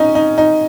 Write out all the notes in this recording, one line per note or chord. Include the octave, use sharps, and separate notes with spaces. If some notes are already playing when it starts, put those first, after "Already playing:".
Already playing: C#4 D#4
D#4
D#4